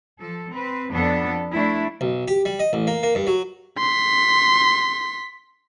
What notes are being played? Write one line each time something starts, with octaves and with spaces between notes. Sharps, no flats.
F3 A4
C4 B4
F2 B3 D4 A4
A3 D4 E4
B1
G4
G3
D#5
A1
A#3
A#3
G2
F#3
C6 B6